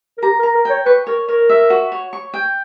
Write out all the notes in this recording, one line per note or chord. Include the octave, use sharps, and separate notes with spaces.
A#4
G4 A#5
A#4
A#5
A#4
C#5 G5
B4 C#6
A#4 C#5
A#4 C#5
E5
F#4
C#5
C#6
G5